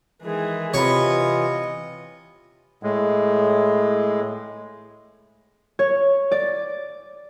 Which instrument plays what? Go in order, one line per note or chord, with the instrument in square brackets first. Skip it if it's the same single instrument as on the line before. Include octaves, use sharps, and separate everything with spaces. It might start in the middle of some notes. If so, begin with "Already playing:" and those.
[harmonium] D#3 G#3 [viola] E3 G#4
[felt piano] C3 B5 [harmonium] E3 F4 [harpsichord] C#5 [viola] D#5
[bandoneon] A2 G#3
[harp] C#5
D5